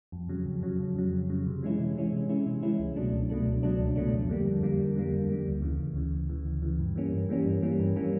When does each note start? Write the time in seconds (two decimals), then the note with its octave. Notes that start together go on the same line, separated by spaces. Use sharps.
0.12 F2
0.29 C#3 F#3
0.46 F2
0.63 C#3 F#3
0.79 F2
0.96 C#3 F#3
1.13 F2
1.30 C#3 F#3
1.46 C3
1.63 E3 G#3 C#4 E4
1.79 C3
1.95 E3 G#3 C#4 E4
2.12 C3
2.29 E3 G#3 C#4 E4
2.46 C3
2.63 E3 G#3 C#4 E4
2.79 C#2
2.96 B2 F#3 A3 D4
3.13 C#2
3.29 B2 F#3 A3 D4
3.46 C#2
3.63 B2 F#3 A3 D4
3.79 C#2
3.96 B2 F#3 A3 D4
4.13 F2
4.29 D3 G3 A#3
4.46 F2
4.63 D3 G3 A#3
4.80 F2
4.96 D3 G3 A#3
5.12 F2
5.29 D3 G3 A#3
5.46 D2
5.62 C#3 E3
5.80 D2
5.96 C#3 E3
6.12 D2
6.29 C#3 E3
6.45 D2
6.62 C#3 E3
6.79 G2
6.96 E3 G3 A#3 C#4
7.12 G2
7.29 E3 G3 A#3 C#4
7.46 G2
7.62 E3 G3 A#3 C#4
7.80 G2
7.96 E3 G3 A#3 C#4